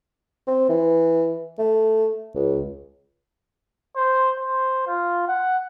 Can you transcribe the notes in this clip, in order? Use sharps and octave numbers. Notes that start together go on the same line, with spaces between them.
C4
E3
A3
C#2
C5
C5
F4
F#5